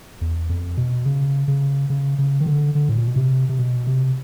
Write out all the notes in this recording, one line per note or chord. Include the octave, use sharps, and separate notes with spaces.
E2
F2
B2
C#3
C#3
C#3
C#3
D#3
D3
D3
A2
A#2
B2
C3
C3
B2
C3